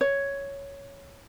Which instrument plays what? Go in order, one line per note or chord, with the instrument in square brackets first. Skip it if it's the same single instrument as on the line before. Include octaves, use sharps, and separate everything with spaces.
[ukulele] C#5